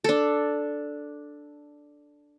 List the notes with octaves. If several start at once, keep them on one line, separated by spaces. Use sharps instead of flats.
D4 A4